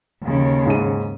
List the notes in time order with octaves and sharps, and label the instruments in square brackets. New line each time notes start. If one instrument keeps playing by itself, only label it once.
[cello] D#2 C#3
[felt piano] G#2 D#7